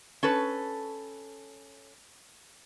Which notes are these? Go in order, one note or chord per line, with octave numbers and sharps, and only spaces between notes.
C#4 A4 B4